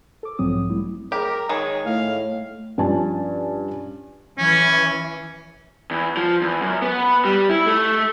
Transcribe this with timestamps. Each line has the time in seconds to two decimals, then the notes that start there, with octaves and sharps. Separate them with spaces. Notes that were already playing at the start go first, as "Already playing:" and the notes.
0.23 A4 D6
0.39 B1 G#2 F3 F#3 C4 D#6
0.69 G3 A3 E4
1.12 G4 G#4 A#4
1.49 D#3 G#3 G#4 C#5
1.85 A2 A3 F5
2.78 G2 F3 C#4 G#5 A5
4.38 E3 C#4
5.91 E2
6.17 F3
6.42 E2
6.62 F#2
6.82 B3
7.25 G3
7.49 E4
7.66 A3